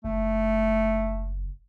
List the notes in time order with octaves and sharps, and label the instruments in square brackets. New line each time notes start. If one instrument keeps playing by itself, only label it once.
[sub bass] F#1 [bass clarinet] A3